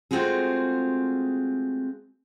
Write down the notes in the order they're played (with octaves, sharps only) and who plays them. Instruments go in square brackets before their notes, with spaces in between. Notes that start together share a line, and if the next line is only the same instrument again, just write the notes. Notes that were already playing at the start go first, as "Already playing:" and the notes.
[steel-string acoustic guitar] G#3 A3 C4 F4 F#4 G#4